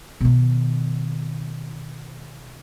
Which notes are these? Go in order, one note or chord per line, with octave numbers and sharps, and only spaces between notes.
B2 D#3